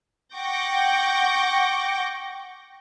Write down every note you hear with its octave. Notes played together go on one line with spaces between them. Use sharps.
F#5 G5 C#6 D6 G6 A#6